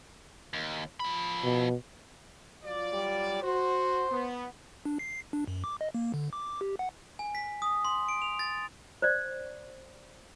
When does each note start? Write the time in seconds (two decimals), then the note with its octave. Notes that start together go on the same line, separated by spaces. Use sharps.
0.53 D#2
1.00 F3 B5
1.44 B2
2.64 F#3 F4 D5
2.93 G3
3.42 F#4 C5
4.09 B3
4.85 D4
4.99 C7
5.33 D4
5.47 F#2
5.64 D6
5.81 D#5
5.94 A#3
6.14 D3
6.33 D6
6.61 G4
6.79 F#5
7.19 G#5
7.35 B6
7.62 D#6
7.85 C6
8.08 D7
8.22 F7
8.39 A6
9.02 C5 D5